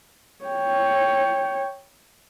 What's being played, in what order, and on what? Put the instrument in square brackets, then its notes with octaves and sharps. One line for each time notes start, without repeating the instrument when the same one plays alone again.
[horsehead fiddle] C#5 G5